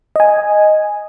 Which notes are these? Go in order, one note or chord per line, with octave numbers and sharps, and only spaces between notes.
D#5 G#5